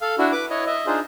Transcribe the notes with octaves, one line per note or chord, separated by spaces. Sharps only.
A4 F5
D4 E4 F#4
B4 D6
E4 C#5 D#5
D#5 E5
D4 D#4 F4 G#4 C5